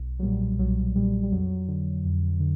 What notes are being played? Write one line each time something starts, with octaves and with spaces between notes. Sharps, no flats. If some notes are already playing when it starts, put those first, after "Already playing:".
Already playing: B1
F#3
A#2 G3
B1 F#3
A#2 G3
G3
F2 F#3
D3
F2
D3